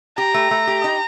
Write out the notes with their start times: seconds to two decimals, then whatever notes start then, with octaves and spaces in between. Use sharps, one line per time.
0.18 G4 A#5
0.34 A3
0.51 A3
0.67 G4
0.84 D#4